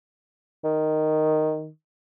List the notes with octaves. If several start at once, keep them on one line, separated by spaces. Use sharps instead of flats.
D#3